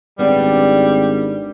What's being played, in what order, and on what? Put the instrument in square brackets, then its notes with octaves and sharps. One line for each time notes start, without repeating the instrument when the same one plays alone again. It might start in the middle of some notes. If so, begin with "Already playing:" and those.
[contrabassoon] G#1 [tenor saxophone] G3 [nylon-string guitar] B3 D4 D5